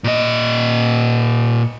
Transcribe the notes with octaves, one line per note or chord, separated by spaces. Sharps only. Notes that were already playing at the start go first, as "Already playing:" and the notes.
A#2 D#5